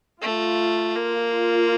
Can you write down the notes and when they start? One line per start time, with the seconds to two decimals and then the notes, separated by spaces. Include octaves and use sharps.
0.22 A3 F4
0.95 A#3
1.31 F4